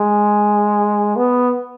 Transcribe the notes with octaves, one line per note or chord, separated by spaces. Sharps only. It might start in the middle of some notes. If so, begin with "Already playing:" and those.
Already playing: G#3
B3